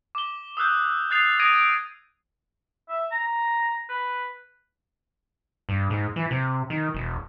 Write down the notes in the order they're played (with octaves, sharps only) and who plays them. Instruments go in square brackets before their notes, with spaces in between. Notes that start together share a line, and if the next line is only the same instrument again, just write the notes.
[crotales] D6 G7
D#6 E6 F#6 G6
D#6 F#6 A6 C7 F7
D#6 G#6 A#6 D7 D#7 F7
D7
[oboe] E5
A#5
B4
[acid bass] G2
G#2
E3
C3
D#3
E1